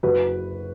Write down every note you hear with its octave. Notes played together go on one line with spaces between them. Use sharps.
F#1 F#4 B4